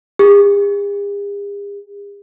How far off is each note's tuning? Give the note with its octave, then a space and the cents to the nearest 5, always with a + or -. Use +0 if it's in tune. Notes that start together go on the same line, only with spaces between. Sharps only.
G#4 -45